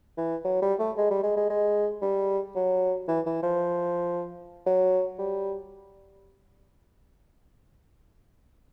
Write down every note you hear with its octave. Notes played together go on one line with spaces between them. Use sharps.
E3
F#3
G3
A3
G#3
G3
G#3
G#3
G#3
G3
F#3
E3
E3
F3
F#3
G3